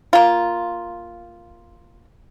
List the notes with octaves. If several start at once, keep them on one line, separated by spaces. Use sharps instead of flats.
A#3 F4